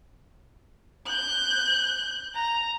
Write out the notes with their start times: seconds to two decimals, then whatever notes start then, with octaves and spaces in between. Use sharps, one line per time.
1.06 F#6 G6
2.35 A#5